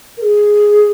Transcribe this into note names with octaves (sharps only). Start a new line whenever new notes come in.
A#4
G#4